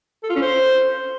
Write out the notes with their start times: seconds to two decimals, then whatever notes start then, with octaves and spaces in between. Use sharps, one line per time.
0.24 A4
0.30 F4
0.36 C#4
0.42 C5